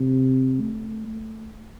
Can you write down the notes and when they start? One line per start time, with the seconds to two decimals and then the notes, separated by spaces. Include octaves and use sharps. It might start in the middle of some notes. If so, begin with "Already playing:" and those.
Already playing: C3
0.61 A3
1.06 A3